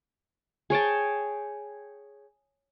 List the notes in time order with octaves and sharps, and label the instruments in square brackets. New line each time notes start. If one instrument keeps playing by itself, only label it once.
[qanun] G#4 C#5 G5 A5